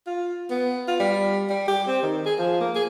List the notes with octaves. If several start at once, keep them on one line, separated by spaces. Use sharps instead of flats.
F4
B3
F4
G3
G3
G4
C4
D#3
G#4
F3
A#3
G#4